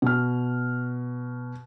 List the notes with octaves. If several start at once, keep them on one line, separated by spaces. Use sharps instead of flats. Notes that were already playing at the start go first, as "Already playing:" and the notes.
B2 F6